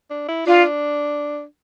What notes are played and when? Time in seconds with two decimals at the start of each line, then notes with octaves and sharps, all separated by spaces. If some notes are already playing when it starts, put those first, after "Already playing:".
0.10 D4
0.28 E4
0.46 D4 F4